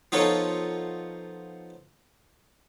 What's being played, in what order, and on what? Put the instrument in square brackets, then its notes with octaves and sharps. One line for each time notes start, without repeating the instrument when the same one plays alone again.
[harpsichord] F3 B3 D#4 F4 A4 C#5